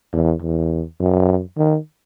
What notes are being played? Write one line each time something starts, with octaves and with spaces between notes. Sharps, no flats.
E2
E2
F#2
D#3